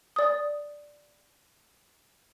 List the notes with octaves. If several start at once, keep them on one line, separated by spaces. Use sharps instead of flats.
D5 D#6